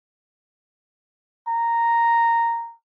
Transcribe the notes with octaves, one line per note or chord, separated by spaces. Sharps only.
A#5